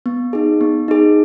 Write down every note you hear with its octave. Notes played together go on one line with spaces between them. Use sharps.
B3
D#4 G#4
B3
D#4 G#4